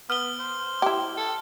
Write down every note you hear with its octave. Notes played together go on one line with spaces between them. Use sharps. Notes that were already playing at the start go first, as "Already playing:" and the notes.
B3 F6 G7
C5
E4 G4
A4